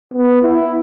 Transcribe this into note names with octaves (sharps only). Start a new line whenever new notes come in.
B3
E4